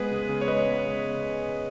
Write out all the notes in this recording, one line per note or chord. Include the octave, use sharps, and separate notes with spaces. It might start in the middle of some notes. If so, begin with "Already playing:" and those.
Already playing: G#3 B3 G#4 B4
C#3
C#3
C#5
G#3 B4 D#5
B3
C#3